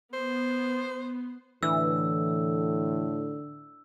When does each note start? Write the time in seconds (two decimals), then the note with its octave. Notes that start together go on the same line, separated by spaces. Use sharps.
0.13 B3 C5
1.63 A2 D3 E3 E6